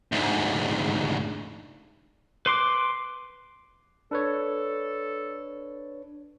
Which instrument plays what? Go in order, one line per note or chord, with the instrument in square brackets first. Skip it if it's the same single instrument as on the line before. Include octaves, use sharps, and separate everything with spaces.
[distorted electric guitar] D2 G#2
[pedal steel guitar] B4 C6 D6
[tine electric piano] D4 B4 C#5 [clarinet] A4